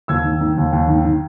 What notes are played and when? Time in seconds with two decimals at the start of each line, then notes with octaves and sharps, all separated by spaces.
0.08 D#2 E6 G#6
0.24 D#3
0.41 D#3
0.57 D#2
0.73 D#2
0.88 D#3
1.05 D#3